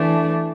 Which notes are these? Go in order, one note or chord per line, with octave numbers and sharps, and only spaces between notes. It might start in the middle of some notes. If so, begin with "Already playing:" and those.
Already playing: E3 A3 D4